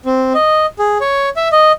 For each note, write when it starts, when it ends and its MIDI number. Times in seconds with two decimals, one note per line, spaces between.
0.06 0.33 60
0.34 0.66 75
0.79 0.98 68
1.01 1.29 73
1.37 1.48 76
1.52 1.72 75